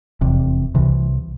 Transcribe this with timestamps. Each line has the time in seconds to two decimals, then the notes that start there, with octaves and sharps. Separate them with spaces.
0.21 F1 E2 C3
0.75 C2 C3 E3